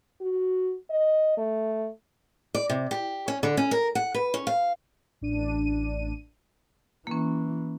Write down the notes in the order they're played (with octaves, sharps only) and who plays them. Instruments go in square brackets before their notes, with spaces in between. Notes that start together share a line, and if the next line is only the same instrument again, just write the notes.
[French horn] F#4
D#5
A3
[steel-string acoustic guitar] D5
C3
G4
C#4
D3
C#4
A#4
F#5
B4
C#4
F5
[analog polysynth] A1 D4 D#7
[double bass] E3 [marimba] A#3 C#4